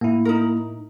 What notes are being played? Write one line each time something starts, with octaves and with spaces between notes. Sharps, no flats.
A2 A#3 E4
D#4 A#4